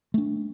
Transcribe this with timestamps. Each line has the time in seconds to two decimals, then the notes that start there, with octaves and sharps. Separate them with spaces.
0.14 A3 D4